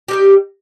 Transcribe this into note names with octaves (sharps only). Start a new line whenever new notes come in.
G3 A#3 D#4 G4